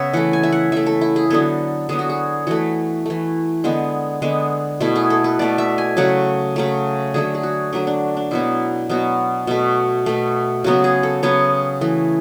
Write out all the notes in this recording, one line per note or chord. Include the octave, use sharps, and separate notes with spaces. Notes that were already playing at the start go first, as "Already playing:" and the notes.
Already playing: C#3 B3 B4 C#5 E5
E3 A3 F#5
G#5
E5
F#5
E3 A3 E5
A4
E4
G#4
D3 F#3 B3 A4
D3 F#3 B3 G#4
F#4
G#4
E3 A3 F#4
E3 A3
D3 G#3 B3
D3 G#3 B3
B2 A3 E4
G#4
A4
B4
B2 A3 D5
E5
G#5
C#3 F#3 A3 F#5
C#3 F#3 A3
D3 F#3 A3 G#4
G#4
F#4
D3 F#3 A3 D4
D4
D4
B2 F#3 B3 E4
B2 F#3 B3 F#4
B2 A3
B2 A3
C#3 F#3 B3 F#4
G#4
A4
C#3 F#3 B3 C#5
E3 A3